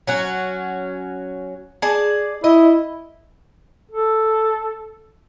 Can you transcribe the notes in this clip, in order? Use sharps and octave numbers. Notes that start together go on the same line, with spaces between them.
F#3 C#4 F#4
G#4 D5 A5
E4 D#5
A4